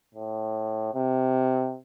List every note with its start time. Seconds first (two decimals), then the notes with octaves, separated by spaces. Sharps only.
0.15 A2
0.94 C3